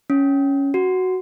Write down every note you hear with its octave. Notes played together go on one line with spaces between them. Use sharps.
C#4
F#4